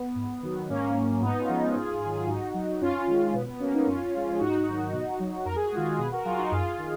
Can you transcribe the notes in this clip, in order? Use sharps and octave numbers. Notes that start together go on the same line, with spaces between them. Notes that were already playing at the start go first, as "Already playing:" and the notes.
Already playing: B3
G#2
D#3 F#3
G#2 A#3 C#4
F#3
G#2 B3 D#4
C#4 F4
F3 G#3
G#2 F4 G#4
D#3 F#3
G#2 D#4 F#4
F#3
F#2 C#4 F4
D#3 G#3
B2 B3
B3
F#3 A#3 C#4
B3 D#4
F#2 C#4 F4
F3 G#3
G#4
G#2 D#4 F#4
D#3 F#3
B2
F#3
F2 A#4
G#4
F#4
D#3 G#3 F4 G#4
B2 G#4 B4
F#4 A#4
F#3 F4 G#4
D#4 F#4
F#2 F4 G#4
D#3